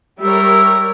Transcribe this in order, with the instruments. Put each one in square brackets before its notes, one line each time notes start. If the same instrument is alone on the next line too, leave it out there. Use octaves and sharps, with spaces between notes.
[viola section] G3 A#4 C#5 [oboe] E5